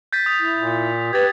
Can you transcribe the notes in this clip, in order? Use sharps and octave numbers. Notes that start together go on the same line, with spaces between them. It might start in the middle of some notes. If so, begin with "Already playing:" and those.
G6 A6 B6
D#6 B6 F7
E4
A#2
G4 B4 G#6 A6